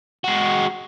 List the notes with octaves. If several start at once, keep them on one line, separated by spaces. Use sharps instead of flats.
G#3 F#4